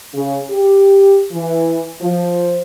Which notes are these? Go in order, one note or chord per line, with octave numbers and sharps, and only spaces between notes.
C#3
G4
E3
F3